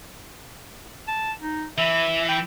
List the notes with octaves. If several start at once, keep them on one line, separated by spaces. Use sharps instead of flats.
A5
D#4
E3 E5
G5